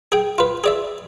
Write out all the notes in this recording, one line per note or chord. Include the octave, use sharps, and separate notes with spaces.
G#4 G5
F4 B4
G#4 D5 E5